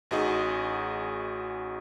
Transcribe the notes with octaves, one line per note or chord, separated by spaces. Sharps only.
A1 D#4 F#4 G#4 D#5